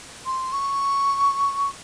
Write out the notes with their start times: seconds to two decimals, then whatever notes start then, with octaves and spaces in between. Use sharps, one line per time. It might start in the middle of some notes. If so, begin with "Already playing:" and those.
0.26 C6
0.52 C#6